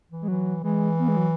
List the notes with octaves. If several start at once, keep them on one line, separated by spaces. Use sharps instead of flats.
E3
G#3
E3 F#3
E3 G#3
B3
G#3
F#3